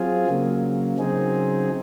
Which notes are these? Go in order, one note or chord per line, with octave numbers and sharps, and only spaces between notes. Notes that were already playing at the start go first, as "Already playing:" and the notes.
Already playing: F#3 C4 F4 G#4
C#3 F#3 A#3
C#3 F#3 C4 D#4 G#4